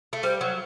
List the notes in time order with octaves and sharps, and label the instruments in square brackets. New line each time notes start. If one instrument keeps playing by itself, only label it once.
[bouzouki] A3
[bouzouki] G3 [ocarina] C5
[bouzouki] F#3